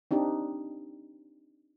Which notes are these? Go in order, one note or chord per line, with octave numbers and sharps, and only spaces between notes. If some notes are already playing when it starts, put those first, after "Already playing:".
C4 D4 D#4 G4